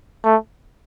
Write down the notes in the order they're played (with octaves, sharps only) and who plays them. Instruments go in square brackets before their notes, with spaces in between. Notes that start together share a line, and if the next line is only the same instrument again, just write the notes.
[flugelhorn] A3